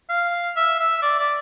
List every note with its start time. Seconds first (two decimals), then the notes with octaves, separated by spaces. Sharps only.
0.09 F5
0.56 E5
0.79 E5
1.02 D5
1.19 D5